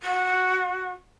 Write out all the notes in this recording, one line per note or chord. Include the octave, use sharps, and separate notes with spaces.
F#4